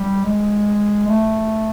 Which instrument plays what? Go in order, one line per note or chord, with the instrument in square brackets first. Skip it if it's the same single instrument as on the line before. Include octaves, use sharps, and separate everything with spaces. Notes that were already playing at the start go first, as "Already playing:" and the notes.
Already playing: [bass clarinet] G3
G#3
A3